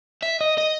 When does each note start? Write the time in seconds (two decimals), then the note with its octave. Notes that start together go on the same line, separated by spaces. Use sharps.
0.23 E5
0.41 D#5
0.58 D#5